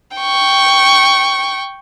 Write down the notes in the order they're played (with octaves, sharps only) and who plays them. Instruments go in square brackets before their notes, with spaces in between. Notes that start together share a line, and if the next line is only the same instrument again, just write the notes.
[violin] G5 C#6